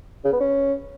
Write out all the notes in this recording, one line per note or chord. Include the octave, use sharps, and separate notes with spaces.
C#3
B3
C#4